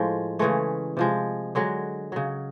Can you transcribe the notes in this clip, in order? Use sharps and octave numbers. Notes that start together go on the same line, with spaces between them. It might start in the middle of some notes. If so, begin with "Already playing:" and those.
Already playing: A2 F3 G#3
C#3 E3 G#3 A3
C3 F3 G#3
D3 F#3 G#3
C#3 F#3